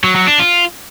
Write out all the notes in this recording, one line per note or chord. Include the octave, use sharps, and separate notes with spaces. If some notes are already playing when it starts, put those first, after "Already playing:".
F#3
F#3
D4
F4